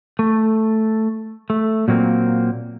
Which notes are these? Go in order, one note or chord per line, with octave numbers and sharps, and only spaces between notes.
A3
A3
A#2 F#3 A#3 C4